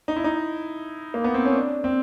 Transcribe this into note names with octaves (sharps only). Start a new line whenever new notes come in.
D#4
E4
D#4
A#3
B3
C4
C#4
D4
C4